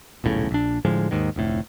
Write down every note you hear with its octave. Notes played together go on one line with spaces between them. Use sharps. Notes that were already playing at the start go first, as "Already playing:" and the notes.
D#1 B1 A2 C#3
A#1 D4
A2 D3 F3 G#3
D#2 G#2 D#3
F1 D2 A2